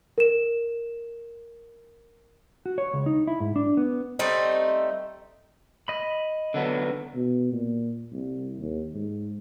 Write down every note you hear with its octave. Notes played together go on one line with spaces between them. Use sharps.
A#4 E7
F#4
C#5
C#2
D#4
E4
G#2
D4
B3
G3 A3 C4 D#4
D#5 B5
D3 F#3 B3
B2
A#2
C2
D#2
G#2